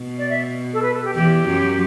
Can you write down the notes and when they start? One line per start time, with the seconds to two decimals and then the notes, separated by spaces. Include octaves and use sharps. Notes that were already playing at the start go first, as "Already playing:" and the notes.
Already playing: B2
0.19 D5
0.30 E5
0.73 A4
0.83 B4
0.94 A4
1.05 G4
1.15 E2 E3 G4
1.47 F#2 F#3